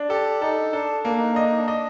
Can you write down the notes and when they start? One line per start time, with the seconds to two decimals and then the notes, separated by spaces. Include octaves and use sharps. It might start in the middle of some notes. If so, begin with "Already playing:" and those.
Already playing: D4
0.09 G4 A4
0.41 D#4 A4
0.73 D4 A4
1.04 A#3 D4
1.18 D#4
1.31 D4 D#5
1.45 D#4
1.58 D4
1.68 D#5